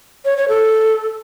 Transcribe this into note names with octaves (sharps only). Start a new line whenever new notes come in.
C#5
C#5
A4